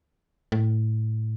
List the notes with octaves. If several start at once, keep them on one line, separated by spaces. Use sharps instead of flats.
A2